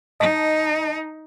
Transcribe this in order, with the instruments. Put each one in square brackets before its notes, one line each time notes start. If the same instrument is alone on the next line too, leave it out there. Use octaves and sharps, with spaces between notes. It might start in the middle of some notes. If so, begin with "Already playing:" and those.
[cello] D#4 [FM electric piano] D#5 A5